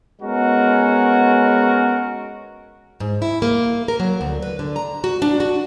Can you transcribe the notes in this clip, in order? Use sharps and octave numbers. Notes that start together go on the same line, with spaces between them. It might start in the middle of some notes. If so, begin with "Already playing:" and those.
G#3 B3 C#4 F#4 A#4
G#2
E4
A#3
A#4
F#3
D2
B4
D3
A#5
F#4
D4
F#4